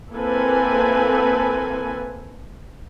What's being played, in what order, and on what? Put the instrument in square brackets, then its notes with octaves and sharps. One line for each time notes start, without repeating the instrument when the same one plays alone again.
[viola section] A#3 C4 E4 A4 B4 G#5